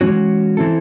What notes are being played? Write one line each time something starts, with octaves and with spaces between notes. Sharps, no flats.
E3 G#3 C#4 F#4 C#5
E3 C4 E4 A4